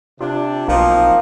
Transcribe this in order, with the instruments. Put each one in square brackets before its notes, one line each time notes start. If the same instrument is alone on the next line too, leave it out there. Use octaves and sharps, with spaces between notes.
[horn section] C3 D4 [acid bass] F4
[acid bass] B1 [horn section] F3 C4 D#4 [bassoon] A#3